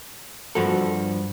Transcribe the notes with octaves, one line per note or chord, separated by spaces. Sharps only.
G2 F3 F#4 A4